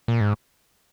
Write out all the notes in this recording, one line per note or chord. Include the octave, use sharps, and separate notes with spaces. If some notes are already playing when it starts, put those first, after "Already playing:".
A#2
G#2